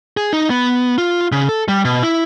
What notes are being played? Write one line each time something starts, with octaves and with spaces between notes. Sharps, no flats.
G#4
D#4
B3
F4
C#3
A4
G3
B2
E4